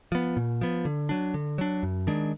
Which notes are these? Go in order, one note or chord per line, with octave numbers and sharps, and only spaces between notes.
F3 B3
A#2
F3 B3
D3
F#3 D4
D3
F#3 D4
F#2
D#3 G#3 D4